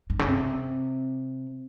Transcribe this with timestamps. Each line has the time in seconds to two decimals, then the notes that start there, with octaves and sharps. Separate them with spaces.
0.10 G2
0.19 C#3
0.28 C3